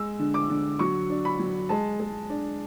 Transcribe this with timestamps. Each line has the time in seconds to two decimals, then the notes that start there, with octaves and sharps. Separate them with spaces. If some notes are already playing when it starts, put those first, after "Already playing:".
Already playing: G#3 E6
0.19 D3
0.34 D6
0.50 D3
0.79 F#3 C#6
1.10 D4
1.25 B5
1.39 F#3
1.69 G#3 A5
2.00 G#3
2.30 D4